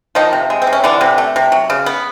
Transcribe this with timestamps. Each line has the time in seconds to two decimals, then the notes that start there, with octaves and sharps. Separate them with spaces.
0.15 D#3 F3 D#4
0.33 C3
0.50 G#3
0.62 C4
0.67 C3
0.73 C#4
0.84 D3 E3 D4
1.01 C3
1.18 A3
1.36 C3
1.52 F#3
1.70 C#3
1.86 B3